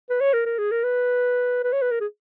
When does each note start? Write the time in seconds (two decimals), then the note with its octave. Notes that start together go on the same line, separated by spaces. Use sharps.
0.10 B4
0.20 C#5
0.33 A#4
0.46 A#4
0.58 G#4
0.71 A#4
0.84 B4
1.63 B4
1.72 C#5
1.81 B4
1.91 A#4
2.00 G#4